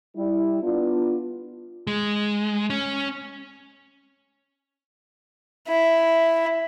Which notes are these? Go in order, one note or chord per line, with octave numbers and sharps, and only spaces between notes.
G3 E4
B3 D4 F4
G#3
C#4
E4